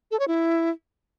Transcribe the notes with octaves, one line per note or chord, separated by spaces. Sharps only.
A4
C#5
E4